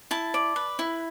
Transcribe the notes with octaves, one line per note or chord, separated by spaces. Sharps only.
E4 A5
D5
B4
E4